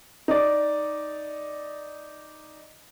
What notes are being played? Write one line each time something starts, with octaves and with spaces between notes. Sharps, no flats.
D#4 D5